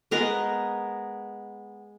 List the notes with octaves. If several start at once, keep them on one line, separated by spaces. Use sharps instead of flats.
G#3 B3 A#4 D#5